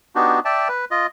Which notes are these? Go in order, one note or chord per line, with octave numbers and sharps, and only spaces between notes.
B3 D4 D#4 F#4 G4
D5 E5 G5 A5
B4
F4 D#5